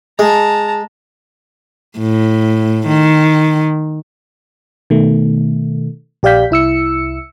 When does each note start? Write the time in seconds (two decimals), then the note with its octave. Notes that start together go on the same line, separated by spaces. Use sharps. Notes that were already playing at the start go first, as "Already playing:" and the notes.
0.19 G#3 A5 A#5
1.99 A2
2.87 D#3
4.90 B2 D#3 A3
6.23 A#1 G4 D5 F5 G6 B6
6.50 C2 E4 E6 C#7